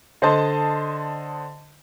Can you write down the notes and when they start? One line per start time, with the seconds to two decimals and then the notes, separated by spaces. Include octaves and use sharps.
0.22 D3 C5 D#5 A5 C6